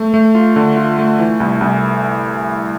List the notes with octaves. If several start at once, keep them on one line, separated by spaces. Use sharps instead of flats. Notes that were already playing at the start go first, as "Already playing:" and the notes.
Already playing: A3
A3
F4
D3
F4
A3
E3
C2
C2